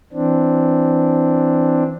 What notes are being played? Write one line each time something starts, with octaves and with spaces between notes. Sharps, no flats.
E3 C4 D4